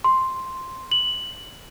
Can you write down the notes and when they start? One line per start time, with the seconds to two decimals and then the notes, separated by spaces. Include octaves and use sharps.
0.04 C6
0.91 F#7